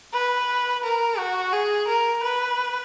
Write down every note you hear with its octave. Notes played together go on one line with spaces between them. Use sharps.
B4
A#4
F#4
G#4
A#4
B4